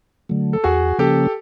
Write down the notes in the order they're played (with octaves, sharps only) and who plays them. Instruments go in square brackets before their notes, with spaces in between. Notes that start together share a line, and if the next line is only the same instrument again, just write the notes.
[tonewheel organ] D3 F#3 A3
[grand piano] A4
[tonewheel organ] E2 [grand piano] F#4 G#4
[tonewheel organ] C#3 F3 A#3 C#4 [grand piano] G4 A4